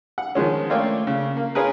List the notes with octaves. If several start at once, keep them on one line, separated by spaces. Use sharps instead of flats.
F#5
D#3 F3 G#3 C#4
A3 A#3 F4 C#5 D5 G5
C#3
A#3
C#4 F4 G#4 A#4 B4